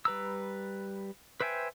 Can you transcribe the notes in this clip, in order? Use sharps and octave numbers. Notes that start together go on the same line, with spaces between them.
G3 B4 A#5 E6
B4 C5 E5 G5 G#5